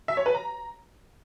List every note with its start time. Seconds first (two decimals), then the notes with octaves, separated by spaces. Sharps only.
0.08 E5
0.17 C#5
0.26 B4
0.35 A#5